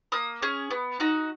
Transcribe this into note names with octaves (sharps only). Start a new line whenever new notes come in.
A#3 D#6
C#4 G#4
B3
D#4 F#4